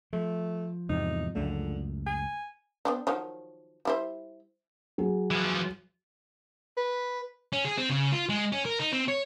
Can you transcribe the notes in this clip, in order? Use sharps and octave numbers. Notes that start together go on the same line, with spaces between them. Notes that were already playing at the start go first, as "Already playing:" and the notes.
F3 A3
E2 G#2 C3 D#4
C#2 F#2 D3 A3
G#5
B3 C4 D4
D#3 F3 F#3
G3 E4 C5
F#3 G#4
E3 F3
B4
C#4
G#4
C4
C#3
F4
G#3
C#4
A#4
D#4
C4
C#5